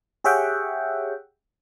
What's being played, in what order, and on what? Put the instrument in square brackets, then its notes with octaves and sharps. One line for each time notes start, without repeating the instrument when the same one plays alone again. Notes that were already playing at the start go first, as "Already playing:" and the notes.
[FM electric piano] G4 G#4 C#5 E5 F#5 G5